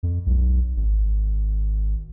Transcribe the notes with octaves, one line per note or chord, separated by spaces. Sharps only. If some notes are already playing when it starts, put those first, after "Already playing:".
F2
B1
G#1